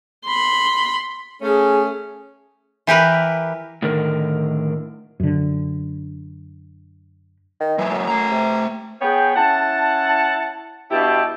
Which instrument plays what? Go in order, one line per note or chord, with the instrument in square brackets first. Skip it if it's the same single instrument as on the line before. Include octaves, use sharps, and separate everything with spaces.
[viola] B5 C6
[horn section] A3 C#4 [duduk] G#4
[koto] E3 G4 A#4 B4
[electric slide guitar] A2 D3 D#3 A#4
[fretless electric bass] F#2 D3
[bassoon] D#3
[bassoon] E3 [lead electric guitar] F#3 G#3
[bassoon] F#2
[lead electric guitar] A3 A#5
[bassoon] C3
[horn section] B3 G#4 C#5 G5
C#4 E4 F#5 A5
G2 B2 E4 G4 G5 A5